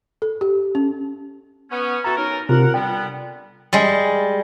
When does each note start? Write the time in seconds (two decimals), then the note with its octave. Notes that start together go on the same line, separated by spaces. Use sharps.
0.22 A4
0.41 G4
0.75 C#4
1.71 B3 C#4
2.04 E3 F#4 A4 A#5
2.16 C#4 D#4 A#4
2.49 C3 F4 A#4 F#5
2.74 D3 G3 B3 G5
3.73 G3 G#3